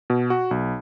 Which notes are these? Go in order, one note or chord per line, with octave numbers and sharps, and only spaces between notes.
B2
F#4
B1